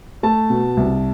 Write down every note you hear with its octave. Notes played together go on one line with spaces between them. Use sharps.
A3 A5
B2
C2